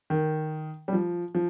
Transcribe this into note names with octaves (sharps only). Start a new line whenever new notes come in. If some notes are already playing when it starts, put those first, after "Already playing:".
D#3
G3
F3
F3